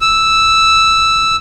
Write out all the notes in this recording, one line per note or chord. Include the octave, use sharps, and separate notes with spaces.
E6